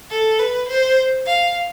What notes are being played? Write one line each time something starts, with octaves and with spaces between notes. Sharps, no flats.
A4
B4
C5
F5